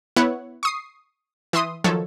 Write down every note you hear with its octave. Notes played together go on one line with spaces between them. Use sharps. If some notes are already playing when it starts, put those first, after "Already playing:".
B3 E4 B4 C#5 F#5
C#6 D#6 C7
E3 E5 C6 D#6
D#3 F3 F#3 A4 C#5